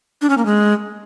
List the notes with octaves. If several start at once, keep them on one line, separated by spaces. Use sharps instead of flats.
D4
C#4
A#3
G#3